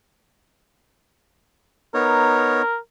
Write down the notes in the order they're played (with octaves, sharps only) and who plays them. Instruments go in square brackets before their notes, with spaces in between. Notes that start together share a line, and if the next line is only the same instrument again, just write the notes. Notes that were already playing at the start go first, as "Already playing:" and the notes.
[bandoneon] B3 D#4 C#5 [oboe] A#4